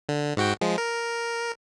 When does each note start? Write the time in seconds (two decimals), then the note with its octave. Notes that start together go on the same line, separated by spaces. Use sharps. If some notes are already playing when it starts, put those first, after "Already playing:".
0.09 D3
0.37 G#2 F#4 G5
0.61 F3 G#3
0.78 A#4